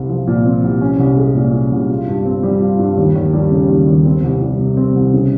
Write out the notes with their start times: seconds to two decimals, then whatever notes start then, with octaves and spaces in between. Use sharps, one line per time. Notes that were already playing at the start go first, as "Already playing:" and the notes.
Already playing: C2 C4
0.09 F3
0.27 A#2
0.45 C4
0.63 C2
0.81 C#4
0.99 C2
1.17 G#3
1.35 A#2
1.53 C#4
1.72 C2
1.89 F4
2.07 G2
2.25 C4
2.43 G3
2.61 F4
2.79 G2
2.97 D#2
3.15 D#2
3.33 G3
3.51 C#3
3.69 D#2
3.87 D#2
4.05 C4
4.23 C2
4.41 G3
4.59 C3
4.77 C4
4.95 C2
5.14 C#3